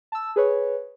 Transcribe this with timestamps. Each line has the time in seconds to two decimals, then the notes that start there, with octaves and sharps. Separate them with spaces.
0.12 A5 E6
0.36 G#4 B4 C#5